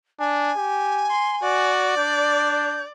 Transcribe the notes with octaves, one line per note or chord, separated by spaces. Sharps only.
D4 G#5
G4
C6
F#4 D5
D4 G6